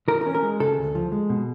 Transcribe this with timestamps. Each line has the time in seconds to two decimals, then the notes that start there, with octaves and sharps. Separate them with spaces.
0.08 E3 A#4
0.21 A#4
0.26 C#4
0.35 A#4
0.43 G#3
0.60 C#3 A4
0.77 D2
0.95 F3
1.12 G#3
1.29 B2